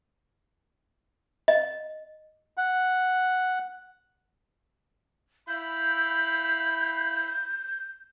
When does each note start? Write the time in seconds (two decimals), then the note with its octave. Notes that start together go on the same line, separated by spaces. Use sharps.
1.48 D#5
2.57 F#5
5.48 E4 F5 B5 G6